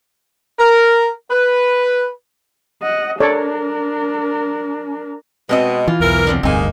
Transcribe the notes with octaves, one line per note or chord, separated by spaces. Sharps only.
A#4
B4
D#5 F#5
D4 A4 A#4 C#5 D5
B2 G#3 C4 D#5
E3 F4
B1 E2 E3 A#4
D3 F3 C4
F1 D2 G2 G#3 A#3 C4 D#4 G#5